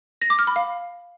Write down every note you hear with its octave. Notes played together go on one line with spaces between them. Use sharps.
A#6
D6
F6
B5
F5